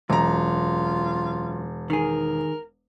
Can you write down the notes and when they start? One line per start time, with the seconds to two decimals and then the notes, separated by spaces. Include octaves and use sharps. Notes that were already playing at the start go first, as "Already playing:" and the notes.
0.10 E1 F#2 F4 A#5
1.90 D#3 G#4 A#4